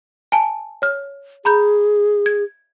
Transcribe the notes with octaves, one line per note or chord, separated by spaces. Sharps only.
G#5 A5
C#5 F6
G#4 A#5 B5 G6
G#6